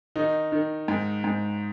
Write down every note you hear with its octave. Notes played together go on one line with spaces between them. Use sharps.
D#3 D#4
D#3
G#2
G#2